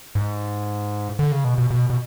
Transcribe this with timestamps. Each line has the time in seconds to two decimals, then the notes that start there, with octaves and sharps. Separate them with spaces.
0.15 G#2
1.19 D3
1.32 C#3
1.44 B2
1.58 B2
1.71 B2
1.90 B2